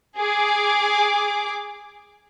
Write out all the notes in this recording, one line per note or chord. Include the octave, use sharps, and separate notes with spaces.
G#4 D6